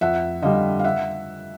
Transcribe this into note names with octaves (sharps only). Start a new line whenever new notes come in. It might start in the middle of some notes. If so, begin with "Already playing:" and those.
F2 E5 F#5
D3 G3 D#5 F5
F5
E5 F#5